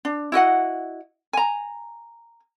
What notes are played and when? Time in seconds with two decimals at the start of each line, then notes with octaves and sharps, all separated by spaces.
0.05 D4
0.32 E4 F#4 D#5 F#5
1.33 G#5 A#5